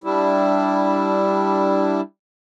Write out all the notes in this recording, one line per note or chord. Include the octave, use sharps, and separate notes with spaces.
G3 D4 E4